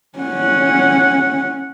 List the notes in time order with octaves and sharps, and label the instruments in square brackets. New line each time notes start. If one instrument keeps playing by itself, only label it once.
[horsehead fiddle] C#4 F#5